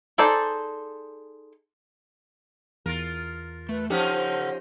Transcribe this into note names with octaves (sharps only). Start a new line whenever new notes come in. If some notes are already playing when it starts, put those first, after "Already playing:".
D#4 G#4 A4 C5 D5
E2 F4 A#4 A6
A3 B4
F3 C#4 D#4 G4 A4 C5 F#5